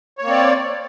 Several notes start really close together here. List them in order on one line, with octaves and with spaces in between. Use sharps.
C#5 A#3 C4 D5